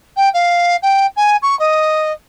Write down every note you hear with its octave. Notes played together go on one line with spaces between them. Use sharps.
G5
F5
G5
G#5
C#6
D#5